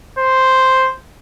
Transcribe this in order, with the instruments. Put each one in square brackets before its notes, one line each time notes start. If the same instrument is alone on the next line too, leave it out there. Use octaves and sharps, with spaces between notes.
[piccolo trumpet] C5